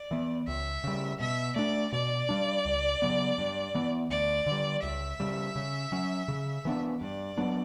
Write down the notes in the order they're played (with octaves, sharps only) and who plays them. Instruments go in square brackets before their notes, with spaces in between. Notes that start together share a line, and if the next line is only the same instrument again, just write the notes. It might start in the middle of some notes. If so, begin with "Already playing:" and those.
Already playing: [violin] D5
[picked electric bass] E3 B3
[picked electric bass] C#2 [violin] E5
[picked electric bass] C#3 G3
[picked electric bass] B2 [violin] E5
[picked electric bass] A3 D4 [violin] D5
[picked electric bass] B2 [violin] D5
[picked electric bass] G3 D4
C#2
C#3 F#3 B3
G2
E3 B3
[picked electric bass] D2 [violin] D5
[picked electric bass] D3
G3
[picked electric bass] C#2 [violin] E5
[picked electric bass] C#3 G3
C#3
F#3 C#4
C#3
E3 B3 D4
[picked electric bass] G2 [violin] D5
[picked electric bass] F#3 B3 D4